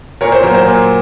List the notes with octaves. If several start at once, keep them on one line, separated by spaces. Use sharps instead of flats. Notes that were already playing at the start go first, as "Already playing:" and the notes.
A#2 A#4 C#5
C5
F#3 A#3 A#4
C5
A#2